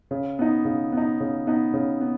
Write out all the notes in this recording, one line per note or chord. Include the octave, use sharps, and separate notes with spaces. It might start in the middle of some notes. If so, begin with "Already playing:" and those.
C#3
B3 D#4
C#3
B3 D#4
C#3
B3 D#4
C#3
B3